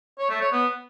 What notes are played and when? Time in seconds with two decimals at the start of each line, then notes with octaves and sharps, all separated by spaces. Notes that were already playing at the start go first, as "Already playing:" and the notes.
0.19 C#5
0.30 A3
0.41 C#5
0.52 B3